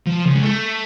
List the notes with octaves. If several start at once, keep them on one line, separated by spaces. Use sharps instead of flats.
F3
C#3
G#3
A3